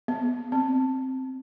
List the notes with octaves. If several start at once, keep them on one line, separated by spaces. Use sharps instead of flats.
B3
C4